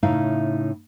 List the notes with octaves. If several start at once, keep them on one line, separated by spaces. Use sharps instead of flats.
A2 C#3 D#4 E4 F5